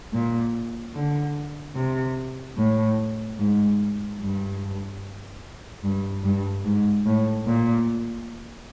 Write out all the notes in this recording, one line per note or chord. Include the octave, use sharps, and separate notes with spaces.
A#2
D3
C3
A2
G#2
G2
G2
G2
G#2
A2
A#2